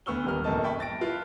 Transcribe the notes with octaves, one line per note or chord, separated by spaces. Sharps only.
D2 B3 C#6 E6 F6 G7
D#1 G3 B3 A#4 F6
D1 F#2 A#3 A4 D#5 A5
D#5 E5 G5 A5 B5 C#6
A5 A6 A#6 D7
E4 F4 B4 F5